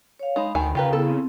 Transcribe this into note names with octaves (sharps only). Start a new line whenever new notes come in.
C#5 F5
G#3 D#4 B5
D2 D#3 G#5
C#3 F4 G4 A#4 B4 F5 A#5
B3 E4 G#4 A4
C4